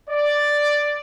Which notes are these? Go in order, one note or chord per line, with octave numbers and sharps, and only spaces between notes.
D5